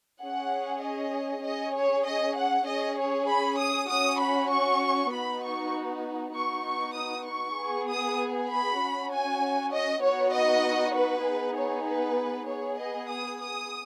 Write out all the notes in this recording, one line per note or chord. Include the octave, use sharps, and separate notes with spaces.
C#4 G#4 F#5
D#5
C#4 G#4 D#5
C#5
D#5
F#5
C#4 G#4 D#5
C#5
B5
D#6
C#4 F#4 D#6
B5
C#6
B3 D#4 F#4 B5
C#6
B3 D#4 F#4 C#6
C#6
D#6
C#6
B3 G#4
D#6
B5
C#4 F#4
G#5
D#5
B3 D#4 F#4 C#5
D#5
B4
B3 D#4 G#4
C#5
B4
B3 G#4 C#5
D#5
D#6
D#6